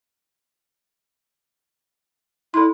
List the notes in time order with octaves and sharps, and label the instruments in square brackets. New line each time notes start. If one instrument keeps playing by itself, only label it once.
[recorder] E4 [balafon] A4 C6